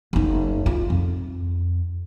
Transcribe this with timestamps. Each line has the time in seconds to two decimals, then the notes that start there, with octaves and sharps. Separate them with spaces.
0.13 F#1 D#4
0.66 F4
0.90 F2